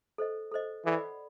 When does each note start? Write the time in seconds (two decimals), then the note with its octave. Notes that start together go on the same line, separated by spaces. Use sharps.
0.18 A4 C5 D#5
0.51 A4 C5 D#5
0.85 E3 A4 D5 F#5 B5